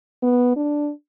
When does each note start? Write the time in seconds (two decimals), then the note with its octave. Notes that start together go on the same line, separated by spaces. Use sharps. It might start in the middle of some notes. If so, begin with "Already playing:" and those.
0.23 B3
0.56 D4